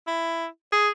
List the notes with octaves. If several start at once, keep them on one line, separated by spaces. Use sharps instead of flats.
E4
G#4